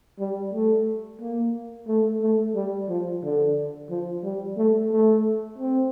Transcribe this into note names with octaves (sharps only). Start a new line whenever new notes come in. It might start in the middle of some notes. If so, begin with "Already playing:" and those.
G3
A3
A#3
A3
A3
G3
F3
D3
F3
G3
A3
A3
C4